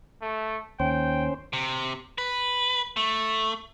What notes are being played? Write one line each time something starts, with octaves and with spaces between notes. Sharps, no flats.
A3
D#2 C#4 C5 G5
C3
B4
A3